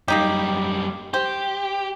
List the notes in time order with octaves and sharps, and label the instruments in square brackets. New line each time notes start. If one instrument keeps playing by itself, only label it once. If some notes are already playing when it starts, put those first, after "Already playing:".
[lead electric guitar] F#2 G3 [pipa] A#3 D#4 G4
[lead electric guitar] G4 [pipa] C5